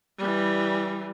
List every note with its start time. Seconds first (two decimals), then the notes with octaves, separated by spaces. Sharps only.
0.18 E3 G3